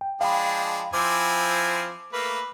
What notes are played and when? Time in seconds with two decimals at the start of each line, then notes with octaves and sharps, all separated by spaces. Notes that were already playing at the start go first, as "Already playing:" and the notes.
0.01 G5
0.21 F3 G#3 D4 F5 G5 B5
0.94 F3 C4 E4 G#5 D6
2.13 A3 A#3 B4